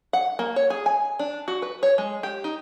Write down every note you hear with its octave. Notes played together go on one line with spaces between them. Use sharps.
F#5
A#3
C#5
G#4
G#5
D4
F#4
B4
C#5
G#3
G4
D#4